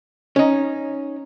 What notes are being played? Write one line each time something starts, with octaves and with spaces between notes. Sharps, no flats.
C#4 D#4